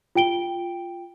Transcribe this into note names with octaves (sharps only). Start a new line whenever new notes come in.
F4 G5 D7 G7